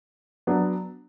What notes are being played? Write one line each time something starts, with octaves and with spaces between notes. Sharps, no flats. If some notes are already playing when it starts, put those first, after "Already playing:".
F#3 B3 D4